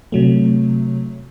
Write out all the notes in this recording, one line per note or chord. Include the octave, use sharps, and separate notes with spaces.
C3 F#3 A3